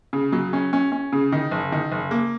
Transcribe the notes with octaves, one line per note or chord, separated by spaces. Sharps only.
C#3
F#3
C#4
C#4
C#4
C#3
D#3
F#1
D#3
F#1
A#3